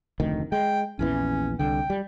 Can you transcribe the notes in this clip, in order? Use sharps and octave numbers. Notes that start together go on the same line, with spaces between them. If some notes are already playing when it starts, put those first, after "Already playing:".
F1 D2 D#3
G#3 G5
A#1 E2 E3 C#4
C2 D3 G5
G3